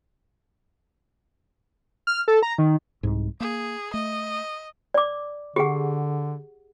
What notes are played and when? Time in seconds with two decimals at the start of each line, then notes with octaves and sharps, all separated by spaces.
2.07 F6
2.28 A4
2.43 A#5
2.58 D#3
3.03 C2 G#2
3.40 A#3 G#4
3.94 A3 D#5
4.94 D5 D6
5.56 D3 G4 G#4 F#5